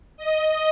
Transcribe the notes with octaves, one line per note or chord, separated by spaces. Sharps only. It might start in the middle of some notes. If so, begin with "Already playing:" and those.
D#5